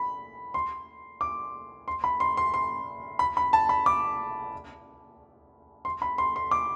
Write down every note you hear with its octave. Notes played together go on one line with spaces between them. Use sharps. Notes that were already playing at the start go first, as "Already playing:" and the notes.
Already playing: B5
C6
D6
C6
B5
C6
C6
C6
B5
B5
A5
B5
D6
C6
B5
C6
C6
D6